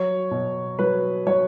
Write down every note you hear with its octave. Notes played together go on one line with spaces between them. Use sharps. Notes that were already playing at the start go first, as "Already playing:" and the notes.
Already playing: F#3 C#5
B2
F#3 B4
F#3 C#5